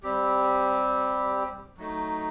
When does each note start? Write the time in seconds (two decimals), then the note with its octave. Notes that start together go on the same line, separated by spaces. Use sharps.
0.03 G3 C4 G4
1.78 F#3 A3 D#4